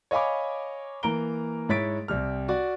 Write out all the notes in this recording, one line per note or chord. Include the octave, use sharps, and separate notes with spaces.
C#5 D#5 F5 G#5 B5 D6
E3 A#3 A#4 A#5 D7 G7
G#2 E4 C#5 A6 B6 D7
C2 C3 F6
F#4 D5